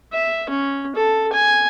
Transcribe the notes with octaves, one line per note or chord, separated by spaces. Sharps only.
E5
C#4
A4
G#5